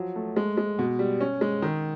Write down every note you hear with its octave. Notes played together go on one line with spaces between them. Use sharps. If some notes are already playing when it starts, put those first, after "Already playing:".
Already playing: F3 F#3
A3
G#3
G#3
B2
G3
C#4
G#3
D#3